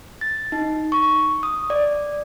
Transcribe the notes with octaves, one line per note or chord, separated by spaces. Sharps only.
A6
D#4
C#6
D#6
D5